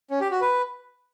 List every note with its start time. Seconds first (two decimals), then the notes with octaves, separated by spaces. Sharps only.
0.11 C#4
0.21 G4
0.31 F#4
0.41 B4